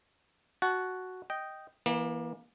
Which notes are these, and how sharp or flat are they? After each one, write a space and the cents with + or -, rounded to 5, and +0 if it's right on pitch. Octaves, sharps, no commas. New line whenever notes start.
F#4 +0 F#5 +0 A5 -20
D#5 +0 G5 -10
E3 +0 A#3 +30